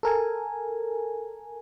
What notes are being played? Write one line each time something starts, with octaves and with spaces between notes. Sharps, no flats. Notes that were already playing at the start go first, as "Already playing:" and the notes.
A4 A#4 G#5